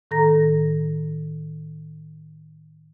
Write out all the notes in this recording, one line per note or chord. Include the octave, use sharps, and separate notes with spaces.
A2 D#3 A4 A#5 A#6